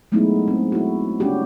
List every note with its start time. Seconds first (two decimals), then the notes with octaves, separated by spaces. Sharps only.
0.12 F#3 G#3 A3 B3 D#4 E4
0.48 C4
0.72 E4 F#4
1.20 G3 C#4 D4 F#4 G4